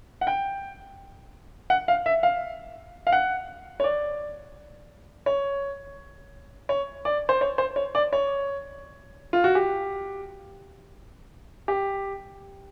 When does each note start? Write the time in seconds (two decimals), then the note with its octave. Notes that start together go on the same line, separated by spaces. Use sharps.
0.21 F#5
0.27 G5
1.70 F#5
1.88 F5
2.06 E5
2.23 F5
3.07 F5
3.12 F#5
3.80 C#5
3.84 D5
5.26 C#5
6.69 C#5
7.05 D5
7.29 C5
7.41 C#5
7.58 C5
7.76 C#5
7.95 D5
8.13 C#5
9.33 F4
9.44 F#4
9.55 G4
11.68 G4